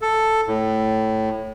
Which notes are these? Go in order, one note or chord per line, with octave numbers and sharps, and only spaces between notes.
A4
A2